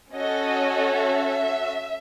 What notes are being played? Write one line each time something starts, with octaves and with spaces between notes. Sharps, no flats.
C#4 F#4 A4 D#5
E5